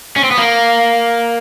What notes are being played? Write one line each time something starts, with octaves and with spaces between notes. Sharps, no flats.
C#4
C4
B3
A#3